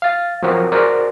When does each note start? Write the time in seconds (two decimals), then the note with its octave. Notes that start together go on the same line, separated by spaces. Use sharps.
0.02 F5 A6
0.43 F3 F#3 C4 F#4 A#4
0.72 F#4 G#4 A#4 C5 D5 F#5